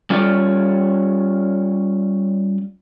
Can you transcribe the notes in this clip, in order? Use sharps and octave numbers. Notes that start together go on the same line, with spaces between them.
G3 C#4 F4 C#5 D5